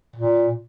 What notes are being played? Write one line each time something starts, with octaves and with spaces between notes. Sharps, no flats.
A#2